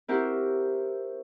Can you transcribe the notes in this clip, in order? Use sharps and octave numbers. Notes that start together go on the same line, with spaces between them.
C4 E4 F#4 G4 A#4